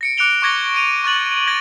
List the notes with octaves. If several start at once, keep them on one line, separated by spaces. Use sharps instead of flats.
A#6 C#7 D7
D6 F#6 C#7 D7 F7 G7
C#6 D6 G#6 A#6 G7
D7 D#7 F7
C#6 F#6 A6 F#7
G#6 A#6 D#7